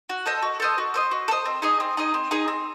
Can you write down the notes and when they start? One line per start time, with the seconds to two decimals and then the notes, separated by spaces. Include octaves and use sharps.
0.09 F#4
0.26 A4 C5 D#5
0.42 F#4
0.60 A4 C5 D#5
0.78 F#4
0.94 A4 C5 D#5
1.11 F#4
1.28 A4
1.31 C5 D#5
1.46 C4
1.62 D#4 G#4 D#5
1.80 C4
1.97 D#4 G#4 D#5
2.14 C4
2.31 D#4 G#4 D#5
2.48 C4